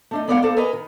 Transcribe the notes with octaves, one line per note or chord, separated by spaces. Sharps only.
A3 D4 D#4
G#3 B3 D5 D#5 F5 F#5
A4 A#4 C5 D5 F5
A#4 B4 D#5 G#5 A#5
D#3